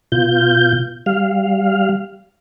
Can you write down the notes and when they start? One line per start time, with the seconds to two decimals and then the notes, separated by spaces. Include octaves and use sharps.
0.12 B2 F4 G6
1.06 G3 F5